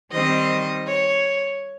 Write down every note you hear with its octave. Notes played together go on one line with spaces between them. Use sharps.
D#3 G3 C4 D#5
C#5